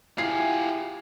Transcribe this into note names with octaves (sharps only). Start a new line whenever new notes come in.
E4 F4 G4 G#4 C7